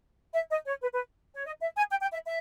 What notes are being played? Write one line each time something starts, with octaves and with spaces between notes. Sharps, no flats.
E5
D#5
C#5
B4
B4
C#5
D#5
E5
G#5
G5
G5
E5
E5